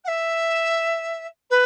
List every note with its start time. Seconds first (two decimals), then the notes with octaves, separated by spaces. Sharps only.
0.04 F#5
0.07 E5
1.50 B4